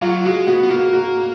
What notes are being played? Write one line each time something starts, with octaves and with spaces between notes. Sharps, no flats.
F#3 F4
G#3 F#4
B3 F#4
B3
A#3 F#4
F#4